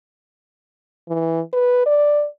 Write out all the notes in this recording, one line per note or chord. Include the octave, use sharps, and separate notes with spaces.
E3
B4
D5